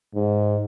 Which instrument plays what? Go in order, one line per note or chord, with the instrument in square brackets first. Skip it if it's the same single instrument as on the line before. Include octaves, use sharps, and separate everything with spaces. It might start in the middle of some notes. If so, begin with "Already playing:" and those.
[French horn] G#2